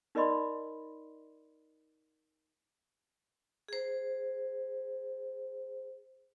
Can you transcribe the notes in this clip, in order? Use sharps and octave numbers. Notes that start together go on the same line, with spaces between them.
D#4 A#4 D5 D#5 B5 C6
G#4 C5